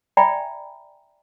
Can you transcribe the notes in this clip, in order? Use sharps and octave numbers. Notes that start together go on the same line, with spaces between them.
D5 E5 G5 G#5 A#5 B5